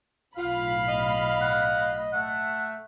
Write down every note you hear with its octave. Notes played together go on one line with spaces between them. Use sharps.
B1 A2 F4 F5 B5
D#5
F#5
A3 E5 F#5